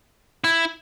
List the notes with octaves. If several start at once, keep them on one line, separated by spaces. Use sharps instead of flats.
E4